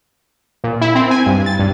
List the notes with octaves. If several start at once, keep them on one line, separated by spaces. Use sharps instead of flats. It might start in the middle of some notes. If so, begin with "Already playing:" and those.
A#2
E4
C4
G#5
G2
A6
G2